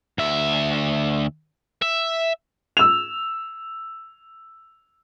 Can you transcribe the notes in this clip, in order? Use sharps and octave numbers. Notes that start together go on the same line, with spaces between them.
D2 E5
E5
E6 F7